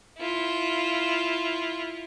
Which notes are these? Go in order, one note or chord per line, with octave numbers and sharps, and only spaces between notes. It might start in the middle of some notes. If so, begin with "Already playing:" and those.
E4 F4